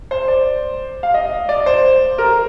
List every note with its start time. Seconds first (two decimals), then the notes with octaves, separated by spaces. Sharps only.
0.11 C5
0.28 D5
1.03 F5
1.14 D#5
1.49 D5
1.66 C5
2.18 A#4